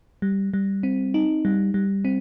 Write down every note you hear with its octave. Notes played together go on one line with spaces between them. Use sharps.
G3
G3
C4
D#4
G3
G3
C4